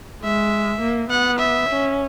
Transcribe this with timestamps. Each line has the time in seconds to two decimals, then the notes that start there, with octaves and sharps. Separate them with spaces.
0.23 G#3 E5
0.81 A#3
1.10 B3 F#5
1.39 E5
1.69 C#4